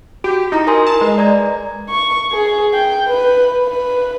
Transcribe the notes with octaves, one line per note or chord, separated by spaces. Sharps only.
F#4 G4
D#4 E4 A#5
A#4 G#5 C6
A5
G#3 B4
D5 A#5 G#6
C#6
G#4
G5
B4
B4